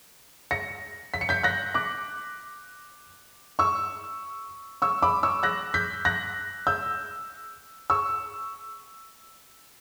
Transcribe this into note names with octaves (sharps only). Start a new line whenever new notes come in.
A#6 C#7
B6
C#7
G6 B6
F#6 A#6
D6 F#6
C#6 E6
C#6 E6
B5 D6
C#6 E6
F#6 A#6
G6 B6
F#6 A#6
E6 G6
C#6 E6